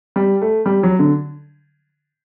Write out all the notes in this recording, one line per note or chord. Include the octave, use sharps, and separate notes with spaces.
G3
A3
G3
F#3
D3